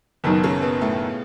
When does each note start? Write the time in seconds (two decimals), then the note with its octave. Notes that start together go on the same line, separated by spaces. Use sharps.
0.24 F#1 F#2 B2 D#3 B3
0.43 C#3 C#4
0.62 B2 B3
0.81 A2 A3